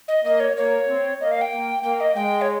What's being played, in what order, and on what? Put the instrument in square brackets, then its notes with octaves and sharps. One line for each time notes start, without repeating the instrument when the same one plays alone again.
[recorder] D#5
[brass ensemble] A#3 [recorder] D#5
[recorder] C#5
[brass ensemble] A#3 [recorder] C#5
[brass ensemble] C4
[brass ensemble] A#3 [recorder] D#5
[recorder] F5
G5
[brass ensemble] A#3
[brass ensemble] A#3 [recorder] G5
[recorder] D#5
[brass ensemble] G#3 [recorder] G5
[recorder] C#5